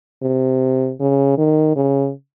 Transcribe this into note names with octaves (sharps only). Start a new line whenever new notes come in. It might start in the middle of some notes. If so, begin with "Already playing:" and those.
C3
C#3
D#3
C#3